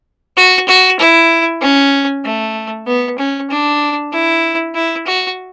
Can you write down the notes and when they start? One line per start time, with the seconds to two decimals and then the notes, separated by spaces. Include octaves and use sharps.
0.37 F#4
0.68 F#4
0.99 E4
1.62 C#4
2.25 A3
2.87 B3
3.18 C#4
3.50 D4
4.12 E4
4.75 E4
5.07 F#4